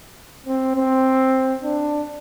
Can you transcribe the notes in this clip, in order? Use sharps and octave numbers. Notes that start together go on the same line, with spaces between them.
C4
C4
D4